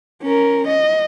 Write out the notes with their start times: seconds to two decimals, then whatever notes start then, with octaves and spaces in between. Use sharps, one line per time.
0.22 C#4 A#4
0.68 D#5